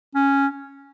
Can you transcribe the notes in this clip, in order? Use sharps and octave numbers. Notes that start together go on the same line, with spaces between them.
C#4